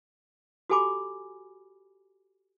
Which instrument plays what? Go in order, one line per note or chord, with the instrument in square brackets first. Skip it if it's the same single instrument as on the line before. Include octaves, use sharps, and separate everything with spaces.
[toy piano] F#4 G4 A4 G#5 B5 D6